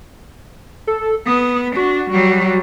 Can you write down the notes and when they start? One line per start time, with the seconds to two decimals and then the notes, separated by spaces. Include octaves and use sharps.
0.87 A4
1.26 B3 D#6
1.76 D4 F#4
2.11 F#3 G3